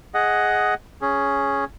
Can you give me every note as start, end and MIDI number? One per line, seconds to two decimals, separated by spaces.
0.14 0.74 68
0.14 0.74 75
0.14 0.74 78
1.02 1.65 61
1.02 1.65 68